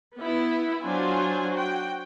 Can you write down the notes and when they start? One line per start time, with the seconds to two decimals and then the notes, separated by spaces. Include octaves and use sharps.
0.18 B3 E4
0.84 F#3 D4 F4 C5 G#5
1.52 F#4 G5